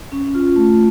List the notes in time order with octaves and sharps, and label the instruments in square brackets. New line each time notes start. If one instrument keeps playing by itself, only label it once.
[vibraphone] C#4
F4
A3